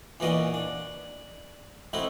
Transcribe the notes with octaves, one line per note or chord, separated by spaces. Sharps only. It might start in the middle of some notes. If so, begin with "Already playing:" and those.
E2 A#2 E3 F#4 D5 D#5
D4
A3 C4 D#4 E4 F#4